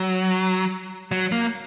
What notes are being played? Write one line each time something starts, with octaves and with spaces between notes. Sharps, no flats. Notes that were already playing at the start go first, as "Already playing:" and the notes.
Already playing: F#3
F#3
A#3